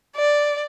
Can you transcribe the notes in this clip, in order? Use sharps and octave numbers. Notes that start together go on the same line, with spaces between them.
D5